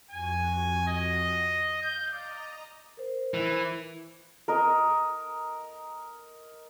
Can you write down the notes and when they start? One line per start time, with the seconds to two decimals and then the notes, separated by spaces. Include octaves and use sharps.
0.11 F2 F#4 G#5
0.88 D#5
1.82 F5 G6
2.13 D5 D#5 A#5
2.97 A#4 C5
3.34 E3
4.48 A#4 D#5